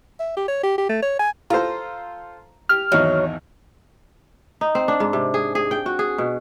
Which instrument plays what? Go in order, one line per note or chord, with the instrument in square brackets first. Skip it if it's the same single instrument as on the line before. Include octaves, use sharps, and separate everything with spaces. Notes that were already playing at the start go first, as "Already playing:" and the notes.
[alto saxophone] E5
G4
C#5
G4
G4
A3
C#5
G#5
[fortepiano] F4 A4 C5 [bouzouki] A#5
[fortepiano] G4 [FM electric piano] F6
[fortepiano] G#1 E2 D#4 [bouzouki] F#3
[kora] D#4
C4
D4
G#2
C3
G#4
G#4
G5
F#4
G#4
B2